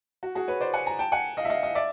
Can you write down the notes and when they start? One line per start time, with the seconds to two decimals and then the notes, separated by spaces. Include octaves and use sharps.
0.23 F#4
0.35 F#4 G#4
0.48 B4 C#5
0.61 C5 D5
0.74 F#5 G#5
0.86 G#5 A#5
0.99 G5 A5
1.12 F#5 G#5
1.37 D#5 F5
1.45 E5
1.50 D#5 F5
1.63 D#5 F5
1.75 D5 E5